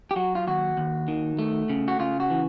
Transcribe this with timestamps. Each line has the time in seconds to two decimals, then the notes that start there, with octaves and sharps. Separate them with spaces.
0.11 G4
0.16 F#3 F#4
0.35 F4
0.47 D#2 F#4
0.77 D#2
1.08 D#3
1.39 A3
1.69 C#3
1.88 F#4
1.99 C#3 F4
2.20 F#4
2.30 E3